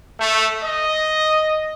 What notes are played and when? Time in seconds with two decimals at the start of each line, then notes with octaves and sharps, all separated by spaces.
0.20 A3
0.63 D#5